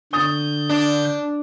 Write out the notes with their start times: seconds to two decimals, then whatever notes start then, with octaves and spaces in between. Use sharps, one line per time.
0.13 D3 C#6 D#6 G6 A6
0.69 D4